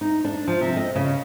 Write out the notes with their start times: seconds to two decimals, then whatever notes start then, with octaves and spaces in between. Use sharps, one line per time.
0.01 D#4
0.25 D4
0.48 F3
0.61 C3
0.77 D#5
0.96 C#3